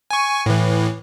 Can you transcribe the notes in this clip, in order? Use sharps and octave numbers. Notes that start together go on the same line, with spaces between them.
G#5 C#6
A2 E3